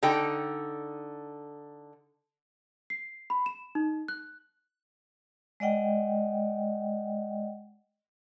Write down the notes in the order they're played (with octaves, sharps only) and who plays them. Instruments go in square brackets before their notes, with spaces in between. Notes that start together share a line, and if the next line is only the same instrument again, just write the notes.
[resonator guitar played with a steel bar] D3 D#4 A4 G5
[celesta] C7
B5
E7
D#4
F#6
[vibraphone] G#3 D5 D#5 F#5 G5